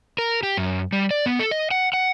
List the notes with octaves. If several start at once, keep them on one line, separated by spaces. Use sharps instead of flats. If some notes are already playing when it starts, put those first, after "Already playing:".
A#4
G4
F#2
G3
D5
B3
A4
D#5
F#5
F#5